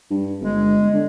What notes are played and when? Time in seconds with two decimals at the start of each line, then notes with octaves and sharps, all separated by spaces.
0.10 G2
0.41 G1 G#3
0.94 D3